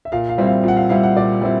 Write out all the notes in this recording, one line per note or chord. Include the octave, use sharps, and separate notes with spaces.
E5
A#2 F5
F5
G3 C4 E4
F5
A#2 F#5
F5
G3 C4 E4 F5
F#5
A#2 D5
G3 C4 E4